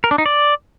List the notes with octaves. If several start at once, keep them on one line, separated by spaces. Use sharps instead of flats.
A#4
D4
D#4
D5